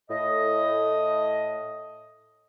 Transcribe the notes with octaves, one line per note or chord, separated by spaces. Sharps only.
A2 D#5